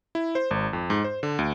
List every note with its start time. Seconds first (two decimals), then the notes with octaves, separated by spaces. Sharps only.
0.15 E4
0.35 C5
0.51 G#1
0.73 F2
0.90 G#2
1.04 C5
1.23 D3
1.39 D2